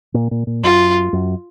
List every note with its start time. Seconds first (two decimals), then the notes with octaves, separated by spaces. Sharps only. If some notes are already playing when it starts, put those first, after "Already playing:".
0.14 A#2
0.31 A#2
0.47 A#2
0.63 F#2 F4
1.13 F#2